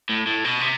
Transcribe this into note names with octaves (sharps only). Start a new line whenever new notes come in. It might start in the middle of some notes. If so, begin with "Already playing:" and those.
A2
A2
B2
C3